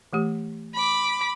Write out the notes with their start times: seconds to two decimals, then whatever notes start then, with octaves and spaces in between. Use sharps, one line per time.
0.13 E3 A3 G4
0.74 B5 D6